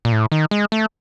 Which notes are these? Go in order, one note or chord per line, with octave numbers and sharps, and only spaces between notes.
A#2
A2
D#3
G#3
A3